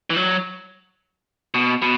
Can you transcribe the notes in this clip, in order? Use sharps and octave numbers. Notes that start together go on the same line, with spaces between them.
E3
F#3
B2
B2